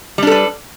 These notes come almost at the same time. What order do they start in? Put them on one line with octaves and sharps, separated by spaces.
G3 D4 A4 B4